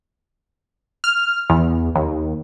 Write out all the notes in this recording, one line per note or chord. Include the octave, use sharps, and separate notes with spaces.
F6
E2
D#2